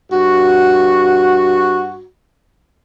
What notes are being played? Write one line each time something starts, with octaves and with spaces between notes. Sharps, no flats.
G2 F#4